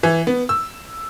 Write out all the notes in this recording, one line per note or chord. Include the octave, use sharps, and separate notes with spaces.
E3
B3
E6